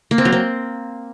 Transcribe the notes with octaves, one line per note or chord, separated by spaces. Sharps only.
A#3
C4
F#3
C4